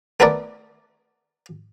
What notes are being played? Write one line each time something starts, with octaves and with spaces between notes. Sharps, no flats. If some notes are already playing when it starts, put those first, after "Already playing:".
A3 B3 E4 A#4 D5